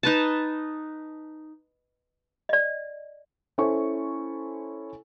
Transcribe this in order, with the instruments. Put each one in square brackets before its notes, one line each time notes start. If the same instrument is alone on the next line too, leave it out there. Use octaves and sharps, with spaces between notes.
[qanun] D#4 B4 A5
[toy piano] D5 D#5
[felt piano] C#4 E4 A4 C5 G#5 C#6